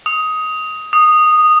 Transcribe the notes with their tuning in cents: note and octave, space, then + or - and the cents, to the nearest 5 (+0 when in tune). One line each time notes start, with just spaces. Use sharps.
D#6 +15
D#6 -10